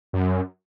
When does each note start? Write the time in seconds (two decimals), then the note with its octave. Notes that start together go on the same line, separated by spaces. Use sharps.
0.13 F#2